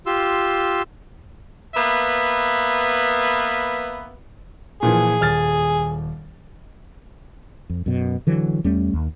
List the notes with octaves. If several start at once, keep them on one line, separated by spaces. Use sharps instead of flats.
F4 G4 C6 E6
A#3 B3 B4 E5
A#2 E3 F3 G#4
D#1 F6 A6
F2
F#2 B2
D3 E3 F#3
E2 G3 A3 C#4
D#2